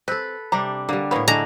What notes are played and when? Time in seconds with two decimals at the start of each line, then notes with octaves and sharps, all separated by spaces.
0.08 C4 A4 B4
0.52 C3 G3 D4 A#5
0.89 D3 G3 A#3
1.11 A2 A#3 B3 C#5
1.28 D3 G#3 E4 A5 A#5